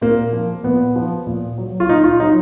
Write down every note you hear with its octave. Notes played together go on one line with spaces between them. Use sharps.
A#2 A#3
F3
A#2 B3
F3
A#2
F#3
F4
A#2 D#4
F4
F#3 D#4